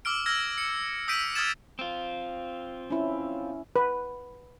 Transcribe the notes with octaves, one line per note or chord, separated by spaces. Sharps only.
D6 E6 F6 D7
E6 F6 G#6 A#6
C#7
D#6 E6 G6 B6 D7 D#7
D#6 F6 G#6 A6 E7
C4 F4
C#4 E4
B4